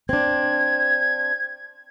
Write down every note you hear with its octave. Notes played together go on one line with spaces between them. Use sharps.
C4 D4 G#6